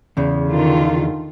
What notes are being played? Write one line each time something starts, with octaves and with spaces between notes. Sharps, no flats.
E2 C#3
D3 D#3 F4